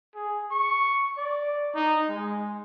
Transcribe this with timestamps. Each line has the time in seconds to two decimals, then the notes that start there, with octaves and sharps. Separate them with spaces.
0.15 G#4
0.51 C#6
1.17 D5
1.74 D#4
2.09 G#3